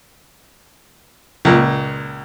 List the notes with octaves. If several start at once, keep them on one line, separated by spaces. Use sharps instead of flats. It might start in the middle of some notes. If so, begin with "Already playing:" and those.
C#2 A#2